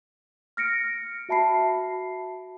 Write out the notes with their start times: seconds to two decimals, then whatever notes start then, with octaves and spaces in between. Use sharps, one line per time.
0.57 F6 A#6 C#7 D7
1.29 F#4 E5 A5 B5 C7